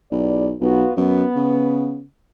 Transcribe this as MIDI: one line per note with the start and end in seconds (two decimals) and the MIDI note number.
0.12 0.55 35
0.12 0.47 40
0.12 0.47 74
0.61 0.84 35
0.61 0.92 59
0.61 0.92 65
0.61 0.92 66
0.97 1.24 42
0.97 2.00 59
1.36 2.03 49